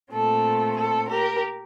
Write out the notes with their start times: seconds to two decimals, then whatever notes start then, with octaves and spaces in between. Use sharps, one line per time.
0.12 A#2 A3 C4 A4
0.77 A4
1.08 G4 A#4